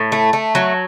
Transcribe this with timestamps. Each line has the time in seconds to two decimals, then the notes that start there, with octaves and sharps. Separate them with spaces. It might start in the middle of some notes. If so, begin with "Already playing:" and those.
Already playing: A2
0.12 A3
0.33 A3
0.55 F#3